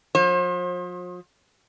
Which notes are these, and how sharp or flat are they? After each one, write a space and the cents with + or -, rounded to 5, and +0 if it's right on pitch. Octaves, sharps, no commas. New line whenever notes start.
F3 +45 C5 +35